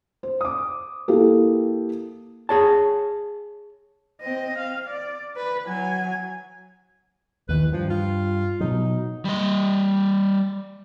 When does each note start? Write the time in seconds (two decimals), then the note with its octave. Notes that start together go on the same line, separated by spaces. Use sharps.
0.23 C5
0.41 D6 D#6
1.08 A#3 E4 G4 A4
2.49 G#4 C#5 A5
4.21 C4 D#5
4.58 F5
4.87 D5
5.36 B4
5.67 F#3 G#5
7.49 D#2 D#3 E3 B4
7.72 G2 F3
7.90 F4
8.60 B2 F#3 D#4
9.25 G3 D#5